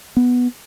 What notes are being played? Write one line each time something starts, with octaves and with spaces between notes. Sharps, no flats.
B3